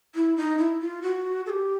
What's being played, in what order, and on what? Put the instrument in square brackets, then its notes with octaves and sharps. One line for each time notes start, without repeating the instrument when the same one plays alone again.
[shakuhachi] E4
D#4
E4
F4
F#4
A4
G4